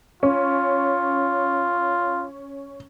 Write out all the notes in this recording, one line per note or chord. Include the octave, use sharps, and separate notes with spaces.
C#4 F4